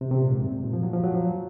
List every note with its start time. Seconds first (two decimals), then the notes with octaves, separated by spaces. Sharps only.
0.01 C3
0.11 C3
0.21 A#2
0.31 G#2
0.42 F#2
0.52 G#2
0.63 A#2
0.73 F3
0.83 F#3
0.93 F3
1.04 F#3
1.14 F3